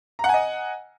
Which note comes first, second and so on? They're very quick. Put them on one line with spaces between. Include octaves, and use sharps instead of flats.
A#5 F#5 G#5 D#5